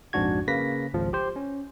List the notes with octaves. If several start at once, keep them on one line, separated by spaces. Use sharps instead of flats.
A#1 F2 G#2 D4 F#4 G#6
C#3 A#3 B4 A#6 B6
G#1 C#2 F3
G4 C5
C#4